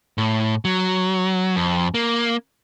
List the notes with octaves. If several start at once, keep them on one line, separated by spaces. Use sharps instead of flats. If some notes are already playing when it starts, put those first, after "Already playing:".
A2
F#3
F2
A#3